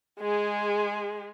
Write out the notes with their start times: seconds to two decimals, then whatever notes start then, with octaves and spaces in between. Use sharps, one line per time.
0.20 G#3 G#4